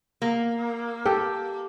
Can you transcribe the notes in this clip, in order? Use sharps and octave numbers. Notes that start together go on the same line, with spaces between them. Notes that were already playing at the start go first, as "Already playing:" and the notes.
A#3
G4 A4 G5